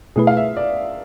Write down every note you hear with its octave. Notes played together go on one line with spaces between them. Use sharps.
B2 A3 E4 G#4 B4
F5
E5
D5